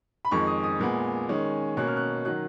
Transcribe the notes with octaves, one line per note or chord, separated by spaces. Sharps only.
B5
F2 D#3 G#3 C#6
D#6
D#6
A#2 G#3 B3
D#3 G#3 C#4
B2 A#3 C#4 F#6
F6
F#6
D#3 F#3 F#6